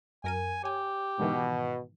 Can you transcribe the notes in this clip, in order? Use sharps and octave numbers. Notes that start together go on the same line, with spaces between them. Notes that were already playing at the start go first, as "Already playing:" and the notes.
F#2 A#4 G#5 D#7
G4 C#5 G#5
G#2 B2 D#3 E3